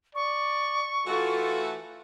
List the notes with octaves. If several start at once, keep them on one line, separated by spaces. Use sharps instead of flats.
D5 C#6
E3 A3 F4 F#4 A4